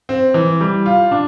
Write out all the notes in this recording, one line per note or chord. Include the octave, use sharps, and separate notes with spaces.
C4
E3
G3
F4
D4